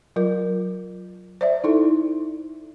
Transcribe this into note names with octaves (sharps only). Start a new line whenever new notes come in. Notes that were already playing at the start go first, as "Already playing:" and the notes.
F#3 F4 A#4
C5 D5 E5
D#4 E4 A4